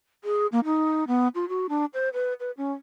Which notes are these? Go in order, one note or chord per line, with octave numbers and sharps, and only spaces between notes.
G#4
A#3
D#4
B3
F4
F#4
D4
C5
B4
B4
C#4